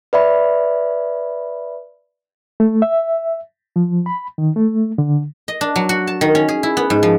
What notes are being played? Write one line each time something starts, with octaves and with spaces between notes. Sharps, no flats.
B4 D5 E5 B5
A3
E5
F3
B5
D#3
A3
D3
D#5
D4
F#3
F#4
A5
D#3
C#4
G#4
E4
B3
G#2
F3